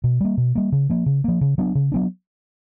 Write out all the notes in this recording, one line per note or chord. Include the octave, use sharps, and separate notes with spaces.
B2
G3 A#3
B2
G3 A#3
C#3
F3 A#3
C#3
F3 A#3
C#3
F#3 B3 D4
C#3
F#3 B3 D4